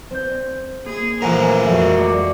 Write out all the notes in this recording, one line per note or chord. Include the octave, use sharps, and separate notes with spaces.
C4 G6
A#3 G#4
A#2 E3 F3 A3 A#4 C5 F#5 G#5
F2 G#3 F#4 E5
D5 D6 C#7